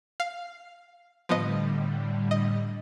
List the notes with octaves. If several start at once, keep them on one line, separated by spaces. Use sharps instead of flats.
F5
A2 D3 F3 G3 B3 D#5
D#5